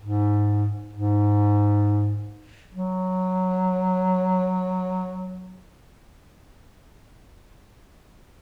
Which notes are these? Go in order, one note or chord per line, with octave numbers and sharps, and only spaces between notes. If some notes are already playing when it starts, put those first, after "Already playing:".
G#2
G#2
F#3